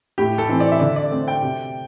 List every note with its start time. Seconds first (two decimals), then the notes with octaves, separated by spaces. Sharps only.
0.18 A2 G4
0.38 A4
0.49 E3 C4
0.60 D5
0.72 E5
0.80 D3 D5
0.96 D5
1.11 A3 C4
1.28 G5
1.42 C3